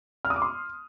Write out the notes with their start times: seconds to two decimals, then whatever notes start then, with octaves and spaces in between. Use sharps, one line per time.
0.25 F6
0.30 D#6
0.36 D6
0.42 C6